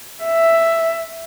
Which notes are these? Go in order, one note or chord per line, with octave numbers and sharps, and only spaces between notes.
E5